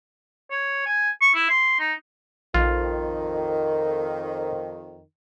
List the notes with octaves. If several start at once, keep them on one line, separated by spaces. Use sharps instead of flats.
C#5
G#5
C#6
E4
C6
D#4
A#1 F2 D#3 F4